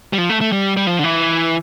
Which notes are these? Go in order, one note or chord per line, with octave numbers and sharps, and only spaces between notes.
G3
F3
A3
A3
G3
G3
F3
D3
E3